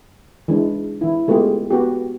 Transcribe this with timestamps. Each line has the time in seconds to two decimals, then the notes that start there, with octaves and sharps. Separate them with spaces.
0.48 E3 G#3 D4
1.01 E3 E4
1.28 G#3 A3 B3 F4 G4 G#4
1.70 B3 F#4 G4